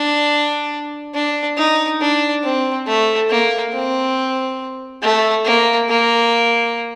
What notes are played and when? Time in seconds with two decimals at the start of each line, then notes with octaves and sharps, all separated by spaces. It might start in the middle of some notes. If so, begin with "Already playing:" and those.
Already playing: D4
1.14 D4
1.57 D#4
2.01 D4
2.44 C4
2.87 A3
3.29 A#3
3.73 C4
5.02 A3
5.45 A#3
5.89 A#3